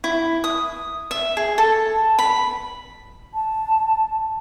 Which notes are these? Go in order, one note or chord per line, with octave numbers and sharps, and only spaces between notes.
E4
D#6
E5
G#4
A4
B5
A5